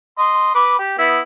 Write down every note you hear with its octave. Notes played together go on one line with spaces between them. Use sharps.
D#5 C6
B4 D6
G4
B3 E4